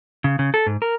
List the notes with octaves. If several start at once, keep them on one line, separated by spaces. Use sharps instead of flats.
C#3
C#3
A4
G#2
A#4